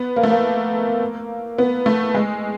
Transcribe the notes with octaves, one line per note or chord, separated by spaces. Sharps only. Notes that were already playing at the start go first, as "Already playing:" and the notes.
Already playing: B3
A#3
A3
A#3
B3
A3
G#3